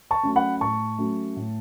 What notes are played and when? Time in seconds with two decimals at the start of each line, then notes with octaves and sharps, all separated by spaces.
0.11 A5 C#6
0.23 F#3 A3 C#4
0.36 F#5 B5
0.61 A2 A5 C#6
0.98 F#3 A3 C#4
1.37 A2